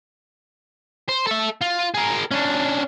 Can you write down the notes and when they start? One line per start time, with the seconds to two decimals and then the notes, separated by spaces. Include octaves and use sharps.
1.09 C5
1.27 A4 E5
1.61 F4
1.94 G#4 A#4
2.31 C#4 D4